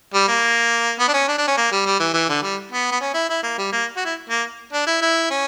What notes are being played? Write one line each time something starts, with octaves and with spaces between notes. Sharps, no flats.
G3
A#3
B3
D4
C#4
D4
D4
C#4
A#3
G3
G3
E3
E3
D3
G3
B3
B3
C#4
E4
E4
A#3
G3
A#3
F#4
E4
A#3
D4
E4
E4
C#4